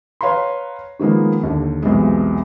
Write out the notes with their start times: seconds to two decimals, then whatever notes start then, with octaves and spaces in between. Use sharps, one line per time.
0.21 B4 C#5 F5 G5 A#5 C6
1.00 D#3 F3 G#3 A#3 B3
1.43 D#2 D3
1.83 B1 E2 C3 G#3